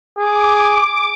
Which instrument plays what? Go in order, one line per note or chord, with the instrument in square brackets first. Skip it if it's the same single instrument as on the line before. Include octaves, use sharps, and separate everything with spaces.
[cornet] G#4 [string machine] D6